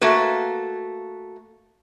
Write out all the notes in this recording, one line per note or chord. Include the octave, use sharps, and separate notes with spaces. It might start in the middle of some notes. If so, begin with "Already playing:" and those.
A3 A#3 F#4 B4